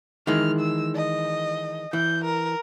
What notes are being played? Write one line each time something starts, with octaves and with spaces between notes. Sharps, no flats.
D#3 E3 G#3 F6
E6
D#5
E3 G6
A#4